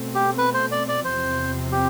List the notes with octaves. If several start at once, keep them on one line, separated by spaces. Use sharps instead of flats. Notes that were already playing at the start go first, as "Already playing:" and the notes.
Already playing: B2 A3 C4
G4
B4
C5
D5
D5
E2 C3 F3 C4 C5
G4